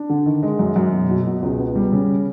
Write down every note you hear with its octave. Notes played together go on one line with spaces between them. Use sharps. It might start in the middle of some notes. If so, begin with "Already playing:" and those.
Already playing: D4
D3
D#3
G#3
F#2
F#2
B2
B2
B2
C#2
B3
G3
C#3